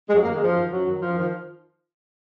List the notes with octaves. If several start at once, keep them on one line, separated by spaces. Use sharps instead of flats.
G#3
F#2 F#3
A#3
D#3
G#3
F#2 F3
D#3
F#2 F#3
D#3
F#2 F3
D#3 F3